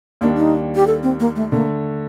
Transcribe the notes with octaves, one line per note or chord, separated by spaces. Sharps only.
D#2 D#3 G3 A#3 D4
D#4
G4
A4
C4
A#3
A3
D3 A3 A#3